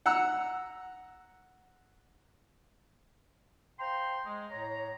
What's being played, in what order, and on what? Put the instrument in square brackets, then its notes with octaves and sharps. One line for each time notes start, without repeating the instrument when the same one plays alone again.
[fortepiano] F#5 A#5 E6 F#6
[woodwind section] C5 F5 G5 A#5 C6
G#3
A2 C#5 A#5